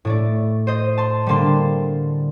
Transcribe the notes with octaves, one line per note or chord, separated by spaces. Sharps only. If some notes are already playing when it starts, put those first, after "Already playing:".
A2 A3 D5
C5 D#5
A5 C6
D3 G3 A#3 A5 C6